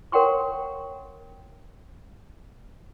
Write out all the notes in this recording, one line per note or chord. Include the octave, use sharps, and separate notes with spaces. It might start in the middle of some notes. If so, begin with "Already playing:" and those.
A#4 C#5 F#5 G5 C6 C#6